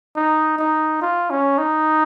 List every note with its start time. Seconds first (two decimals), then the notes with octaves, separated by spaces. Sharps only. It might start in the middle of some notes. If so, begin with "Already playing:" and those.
0.16 D#4
0.58 D#4
1.02 F4
1.30 C#4
1.58 D#4